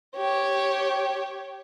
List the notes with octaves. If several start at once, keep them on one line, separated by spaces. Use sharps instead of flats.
G4 C#5